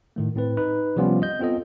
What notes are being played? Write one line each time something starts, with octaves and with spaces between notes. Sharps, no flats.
A2 D#3 A3
A2 C4 B4
D#4 B4
C3 F3 G3 B3 C#4 F4
D#5 G6
B3 C4 F4 A4 D#5